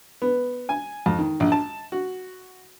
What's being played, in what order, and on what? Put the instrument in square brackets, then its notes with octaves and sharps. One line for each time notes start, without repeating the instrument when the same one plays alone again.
[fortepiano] B3
G#5
F2
D#3
A#1
A5
F#4